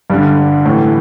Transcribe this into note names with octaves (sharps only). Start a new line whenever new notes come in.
G2 D3 G3
A2 E3